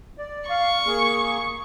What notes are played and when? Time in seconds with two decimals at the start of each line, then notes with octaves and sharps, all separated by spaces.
0.18 D5
0.50 F5 C#6
0.87 A#3 G#4